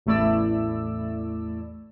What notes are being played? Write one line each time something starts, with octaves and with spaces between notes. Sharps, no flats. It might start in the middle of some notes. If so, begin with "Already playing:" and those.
A1 E2 A3 E4 D5 E6